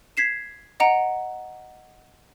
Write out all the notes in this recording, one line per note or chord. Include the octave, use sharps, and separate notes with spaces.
G#6 B6 C7 E7
D#5 F#5 A#5 D7